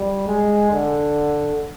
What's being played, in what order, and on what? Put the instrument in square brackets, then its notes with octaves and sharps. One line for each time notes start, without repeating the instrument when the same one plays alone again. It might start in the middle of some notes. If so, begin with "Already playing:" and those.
Already playing: [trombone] G3
G#3
D3